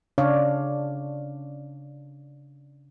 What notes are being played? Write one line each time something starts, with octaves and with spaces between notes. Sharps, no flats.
C#3 D4 C#5 D5 F5